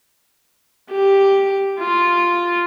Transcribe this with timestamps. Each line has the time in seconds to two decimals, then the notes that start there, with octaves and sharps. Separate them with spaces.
0.91 G4
1.80 F4